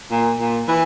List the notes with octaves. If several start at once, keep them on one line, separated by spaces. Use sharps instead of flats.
A#2
A#2
E3